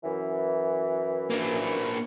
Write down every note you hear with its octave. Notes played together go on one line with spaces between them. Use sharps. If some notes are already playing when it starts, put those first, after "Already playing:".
F#2 E3
A#3 D4